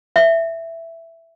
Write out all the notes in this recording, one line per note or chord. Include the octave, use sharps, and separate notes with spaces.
E5